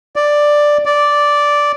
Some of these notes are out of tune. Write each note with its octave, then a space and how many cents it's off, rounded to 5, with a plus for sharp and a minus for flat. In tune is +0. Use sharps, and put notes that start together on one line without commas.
D5 +5
D5 -5